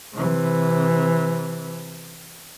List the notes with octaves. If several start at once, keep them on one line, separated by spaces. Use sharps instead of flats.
C3 E3